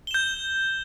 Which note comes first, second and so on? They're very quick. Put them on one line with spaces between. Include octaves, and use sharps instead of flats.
G7 E7 G6